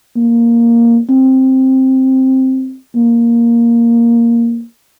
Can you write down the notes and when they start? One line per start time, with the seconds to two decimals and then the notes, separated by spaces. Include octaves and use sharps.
0.16 A#3
1.09 C4
2.96 A#3